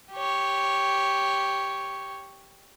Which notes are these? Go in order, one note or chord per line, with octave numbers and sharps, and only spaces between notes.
G4 C#5